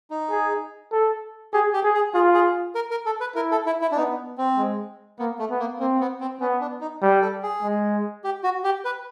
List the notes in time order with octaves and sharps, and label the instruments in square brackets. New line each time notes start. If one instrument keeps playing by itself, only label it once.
[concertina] D#4
[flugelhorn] G#4
A4
[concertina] G4 [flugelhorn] G#4
[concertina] G4
[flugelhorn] G#4
[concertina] G#4
[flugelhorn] F4 [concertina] G#4
[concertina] G#4
A#4
A#4
A4
B4
[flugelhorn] E4 [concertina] A#4
[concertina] A4
E4
E4
D4
[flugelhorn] B3 [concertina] D#4
[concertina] C4
[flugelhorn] G#3
[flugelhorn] A#3 [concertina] B3
[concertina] A3
[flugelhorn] B3
[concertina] A#3
[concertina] A#3 [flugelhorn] C4
[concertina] B3
C4
[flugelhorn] B3 [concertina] C#4
[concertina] D4
D#4
[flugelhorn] G3
[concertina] A4
G#4
[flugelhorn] G#3
[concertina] G4
F#4
G4
B4